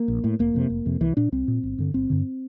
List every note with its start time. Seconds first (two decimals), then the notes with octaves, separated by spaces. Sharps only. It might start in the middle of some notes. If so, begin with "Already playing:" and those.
Already playing: A#3
0.08 A#1
0.24 A2
0.39 F1 A#3
0.54 F2 C3
0.70 F1
0.86 F2 C3
1.01 C2 E3
1.17 A#2 D4
1.32 C2 C4
1.48 A#2
1.63 G1
1.78 G2 D3
1.94 G1 C4
2.10 G2 D3